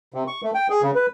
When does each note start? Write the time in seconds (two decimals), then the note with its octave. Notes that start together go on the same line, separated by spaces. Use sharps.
0.14 C3
0.27 C#6
0.43 A3
0.55 G5
0.70 G#4
0.82 C#3
0.95 B4